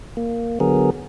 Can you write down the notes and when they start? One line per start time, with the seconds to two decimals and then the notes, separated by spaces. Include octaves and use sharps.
0.17 A#3
0.60 D3 F#3 B3 G#4 A#4